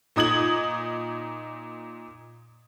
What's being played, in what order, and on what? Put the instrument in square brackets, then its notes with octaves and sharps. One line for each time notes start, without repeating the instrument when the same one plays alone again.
[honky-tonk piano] A#2 D#4 D#6 G#6 F#7